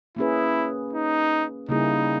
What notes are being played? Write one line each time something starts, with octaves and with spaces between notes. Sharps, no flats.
A#3 C#4 E4 G#4 B4
D#4
C#3 G3 A#3 D#4 E4 G#4